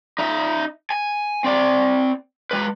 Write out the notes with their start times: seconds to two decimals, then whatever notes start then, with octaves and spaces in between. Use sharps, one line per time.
0.19 D#4 E5
0.90 G#5
1.44 C4 D5
2.51 G#3 B4